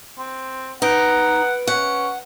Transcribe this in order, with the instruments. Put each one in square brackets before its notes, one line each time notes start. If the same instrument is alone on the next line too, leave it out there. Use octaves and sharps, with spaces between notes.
[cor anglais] C4
[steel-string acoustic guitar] D#4 [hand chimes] B4 D7 [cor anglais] F#5
[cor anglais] C#4 [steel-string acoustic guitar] F#5